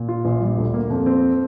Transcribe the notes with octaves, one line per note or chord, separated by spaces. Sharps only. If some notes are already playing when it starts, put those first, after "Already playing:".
Already playing: A#2
F4
A#1
G3
D2
A#3
F2
C4